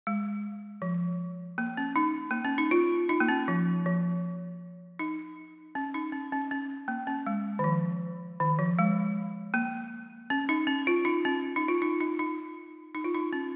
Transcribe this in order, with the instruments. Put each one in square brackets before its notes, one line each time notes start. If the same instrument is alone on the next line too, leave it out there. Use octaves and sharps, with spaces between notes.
[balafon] G#3
F3
A#3
C#4
D#4
A#3
C#4
D#4
F4
D#4
A#3
C#4
F3
F3
D#4
C#4
D#4
C#4
C#4
C#4
A#3
C#4
G#3
D#3
F3
D#3
F3
G#3
A#3
C#4
D#4
C#4
F4
D#4
C#4
D#4
F4
D#4
D#4
D#4
D#4
F4
D#4
C#4